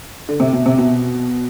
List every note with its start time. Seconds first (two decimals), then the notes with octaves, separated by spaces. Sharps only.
0.29 D3
0.40 C3
0.53 B2
0.66 C3
0.78 B2